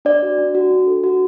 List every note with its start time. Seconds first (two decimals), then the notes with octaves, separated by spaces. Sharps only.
0.05 D4 D5
0.22 F#4
0.38 D4
0.55 F#4
0.71 D4
0.87 A4
1.04 F#4